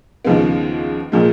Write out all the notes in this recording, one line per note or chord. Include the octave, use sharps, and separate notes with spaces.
D#2 C#3 F3 G#3 B3
A#2 F3 G#3